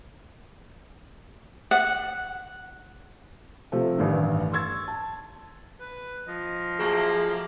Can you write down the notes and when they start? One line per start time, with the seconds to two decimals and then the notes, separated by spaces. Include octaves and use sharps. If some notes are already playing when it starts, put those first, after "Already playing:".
1.71 F#5
3.72 C3 F3 A3
3.98 A1 G2 D#3
4.52 C6 C#6 E6 G#6 A6
4.88 A5
5.80 B4
6.28 F3 D#5
6.79 F#3 A3 A#3 G#4